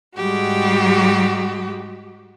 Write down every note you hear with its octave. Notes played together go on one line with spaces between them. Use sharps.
G#2 G3 G#3 F#4 G4